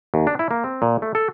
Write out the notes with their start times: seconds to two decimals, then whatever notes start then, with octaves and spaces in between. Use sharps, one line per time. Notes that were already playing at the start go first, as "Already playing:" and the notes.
0.14 D#2
0.27 D4
0.39 E4
0.51 A#3
0.64 C4
0.82 A#2
1.02 A3
1.15 A4